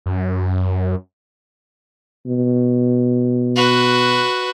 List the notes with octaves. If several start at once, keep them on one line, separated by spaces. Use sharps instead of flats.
F#2
B2
F#4 B4